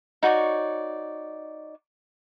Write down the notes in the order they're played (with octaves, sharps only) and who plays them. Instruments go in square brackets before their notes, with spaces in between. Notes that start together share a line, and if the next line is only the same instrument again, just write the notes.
[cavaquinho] D#4 F#4 C#5 D5